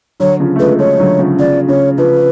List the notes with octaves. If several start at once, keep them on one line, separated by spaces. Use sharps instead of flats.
D3 F#3 C#5
C#3 F3
A3
F3 G#3 B4
F3 G#3 C#5
D3 F#3
C#3 F3
C#3 F3 D5
C#3 C#5
C#3 F3 B4